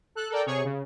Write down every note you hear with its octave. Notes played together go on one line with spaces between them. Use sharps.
A4 F#6
A4 A#4 D5 G5
C3 G#4 C#5 C#6
C#3